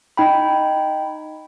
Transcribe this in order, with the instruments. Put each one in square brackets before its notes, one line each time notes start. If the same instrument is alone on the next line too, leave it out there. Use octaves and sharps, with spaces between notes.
[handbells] D#4 G5 B5